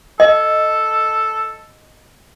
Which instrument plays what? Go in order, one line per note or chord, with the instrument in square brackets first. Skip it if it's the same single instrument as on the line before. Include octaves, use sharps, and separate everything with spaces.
[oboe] A4 [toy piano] D#5